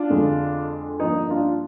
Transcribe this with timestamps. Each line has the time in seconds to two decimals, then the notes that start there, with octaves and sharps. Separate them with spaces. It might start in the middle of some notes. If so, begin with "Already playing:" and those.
Already playing: D4 F4
0.10 F2 D3 G#3
1.00 G2 F3 A#3 D#4
1.30 D4 F4